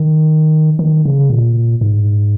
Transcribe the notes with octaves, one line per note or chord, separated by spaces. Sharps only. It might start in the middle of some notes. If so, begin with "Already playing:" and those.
Already playing: D#3
D#3
C#3
A#2
G#2